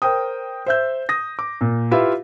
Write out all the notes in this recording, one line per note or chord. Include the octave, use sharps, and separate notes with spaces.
A#4 C5 G5 D#6
C5 E5 G6
D#6 A#6
D6
A#2
E4 F4 G4 B4 E5 F5